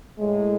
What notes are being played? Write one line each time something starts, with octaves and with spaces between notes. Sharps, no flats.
A2 G#3